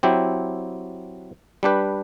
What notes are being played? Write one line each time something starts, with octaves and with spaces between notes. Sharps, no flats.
F#3 C4 E4 G4
G3 D4 G4 B4